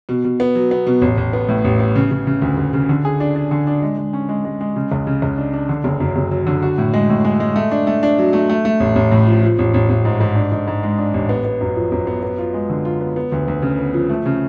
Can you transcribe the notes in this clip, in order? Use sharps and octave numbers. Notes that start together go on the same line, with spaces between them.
B2
B2
B3
F#3
B3
B2
A1
A1
B3
A2
A1
B3
C#3
C#3
C#3
D2
D2
C#3
D3
G#4
D4
D4
D3
D4
G#3
G#3
C#4
G#3
G#3
G#3
C#3
C#2
C#3
C#2
D4
D4
D3
F#1
F#2
F#1
F#3
D3
F#4
A2
G#3
A2
G#3
G#3
A3
D4
A3
D4
F#3
A3
A3
A3
A1
A1
A2
F3
F3
A1
A1
A1
G#2
G#2
D4
G#2
G#2
G#3
D4
A1
B3
B3
F#2
F3
F#2
B3
B3
F4
G#3
D3
F4
B3
B3
D2
D2
C#3
B3
F3
A3
C#3